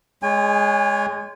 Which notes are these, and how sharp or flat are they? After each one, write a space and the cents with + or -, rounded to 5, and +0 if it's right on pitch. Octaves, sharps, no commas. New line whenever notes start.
G#3 +0 C#5 +20 G#5 -35